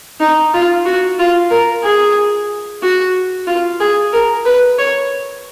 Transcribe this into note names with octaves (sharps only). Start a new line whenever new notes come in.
D#4
F4
F#4
F4
A#4
G#4
F#4
F4
G#4
A#4
B4
C#5